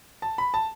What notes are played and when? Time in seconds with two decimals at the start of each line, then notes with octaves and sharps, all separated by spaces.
0.22 A5
0.38 B5
0.54 A5